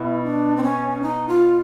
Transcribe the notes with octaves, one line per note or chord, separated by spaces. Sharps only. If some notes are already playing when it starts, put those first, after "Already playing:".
Already playing: B2 E4
D4
C4
C#4
D#4
F4